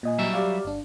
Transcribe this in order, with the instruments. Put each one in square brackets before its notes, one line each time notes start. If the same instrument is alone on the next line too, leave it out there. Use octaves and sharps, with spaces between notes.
[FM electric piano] A#2 D#5 G#5
[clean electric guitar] F#3 G3 E5
[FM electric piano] G4 D5 F5
G1 D4